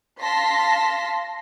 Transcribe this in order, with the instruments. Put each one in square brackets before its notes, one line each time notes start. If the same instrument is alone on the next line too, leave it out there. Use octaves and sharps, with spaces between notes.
[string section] F5 A5 C6 A#6 B6